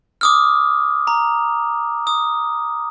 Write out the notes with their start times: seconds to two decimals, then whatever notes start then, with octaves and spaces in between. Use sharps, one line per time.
0.21 D6 D#6 F6
1.07 A#5
2.07 D#6